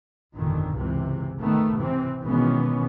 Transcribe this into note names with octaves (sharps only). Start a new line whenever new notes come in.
G1 F2 A#2 D3 D#3
C#2 C3 E3
D#3 A3 B3
C3 E3 C4
B2 D#3 E3 G#3 B3 C#4